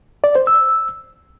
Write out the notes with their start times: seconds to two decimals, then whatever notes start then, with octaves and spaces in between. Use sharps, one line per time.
0.24 D5
0.35 C5
0.47 E6